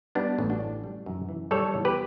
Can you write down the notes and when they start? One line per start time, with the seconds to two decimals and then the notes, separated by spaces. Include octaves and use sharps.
0.15 G3 B3 D4
0.39 A1
0.50 D4 F#4
0.61 A2
0.84 G3
1.06 F#2
1.29 E3
1.51 G3 A4 C#5
1.74 E2
1.85 G4 B4